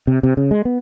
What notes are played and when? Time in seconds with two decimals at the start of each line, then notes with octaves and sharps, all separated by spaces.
0.07 C3
0.23 C3
0.37 C#3
0.51 G#3
0.65 B3